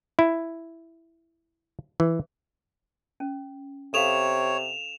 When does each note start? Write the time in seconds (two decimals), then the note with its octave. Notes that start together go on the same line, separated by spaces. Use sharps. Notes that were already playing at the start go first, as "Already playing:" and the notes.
0.19 E4
2.00 E3
3.20 C#4
3.94 C3 A4 C#5 F5 E7 F7